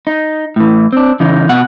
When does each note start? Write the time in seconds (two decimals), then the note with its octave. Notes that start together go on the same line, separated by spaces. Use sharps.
0.07 D#4
0.56 A2 E3
0.93 C4 D4
1.20 C#3 E3 D#4
1.49 B2 F#5